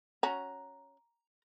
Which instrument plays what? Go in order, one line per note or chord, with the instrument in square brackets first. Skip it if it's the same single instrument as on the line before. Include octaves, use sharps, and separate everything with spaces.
[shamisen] C#4 F#4 [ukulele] A#5